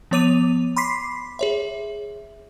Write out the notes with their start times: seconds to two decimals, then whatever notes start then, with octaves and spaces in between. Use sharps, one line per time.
0.11 F3 B3 C#5 D6 D#7 F7
0.77 B5 C6 D6 B6 C7
1.39 G#4 C#5 E5